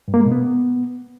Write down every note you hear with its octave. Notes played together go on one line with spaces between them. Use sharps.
G2
A#3
G#3
B2
B3